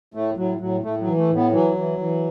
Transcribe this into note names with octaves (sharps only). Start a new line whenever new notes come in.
A2 A3
A2 F#3
A2 F#3
A2 A3
F#3
E3
A3
A2
B3
E3 F#3
E3
E3